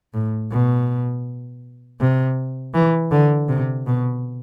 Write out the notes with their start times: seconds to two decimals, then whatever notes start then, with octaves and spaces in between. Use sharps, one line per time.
0.14 A2
0.52 B2
2.00 C3
2.74 E3
3.11 D3
3.49 C3
3.86 B2